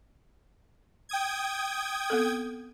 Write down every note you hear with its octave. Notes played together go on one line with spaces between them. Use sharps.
G5 D#6 G#6
B3 C4 A4